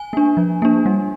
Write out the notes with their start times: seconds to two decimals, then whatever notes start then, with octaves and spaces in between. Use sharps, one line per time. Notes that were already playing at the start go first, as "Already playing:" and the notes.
Already playing: G#5
0.13 A#3 D4
0.37 F3
0.62 A#3 D4
0.86 G3